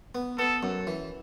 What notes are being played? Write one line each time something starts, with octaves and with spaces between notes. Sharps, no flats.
B3
B3 A4
F#2
E3